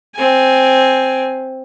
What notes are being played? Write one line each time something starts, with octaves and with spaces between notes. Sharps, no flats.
C4 G#5